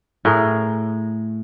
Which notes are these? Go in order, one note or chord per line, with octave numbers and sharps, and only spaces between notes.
A2 G#4 A#4